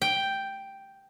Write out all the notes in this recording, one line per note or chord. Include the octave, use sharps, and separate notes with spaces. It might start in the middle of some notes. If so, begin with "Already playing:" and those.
G5